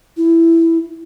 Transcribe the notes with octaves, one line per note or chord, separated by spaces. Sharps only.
E4